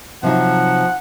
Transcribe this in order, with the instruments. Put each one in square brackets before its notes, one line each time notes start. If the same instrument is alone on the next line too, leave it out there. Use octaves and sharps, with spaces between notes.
[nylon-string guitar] C3 F#3 D#4 [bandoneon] F3 [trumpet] F#5